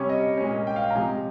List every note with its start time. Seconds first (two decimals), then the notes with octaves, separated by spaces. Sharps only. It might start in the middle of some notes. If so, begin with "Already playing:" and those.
Already playing: C3 G3 C#4 C#5
0.09 D#5
0.38 A#2 G#3 C#4
0.67 G5
0.76 F5
0.81 G5
0.90 A#5
0.95 C3 F3 G#3 G#5